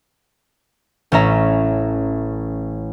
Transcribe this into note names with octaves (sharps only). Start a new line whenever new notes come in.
A1 C#4 E5 A#5